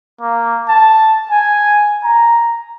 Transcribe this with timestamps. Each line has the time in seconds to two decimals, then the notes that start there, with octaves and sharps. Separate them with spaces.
0.21 A#3
0.69 A5
1.31 G#5
2.04 A#5